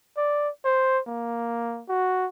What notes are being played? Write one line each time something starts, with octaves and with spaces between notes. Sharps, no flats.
D5
C5
A#3
F#4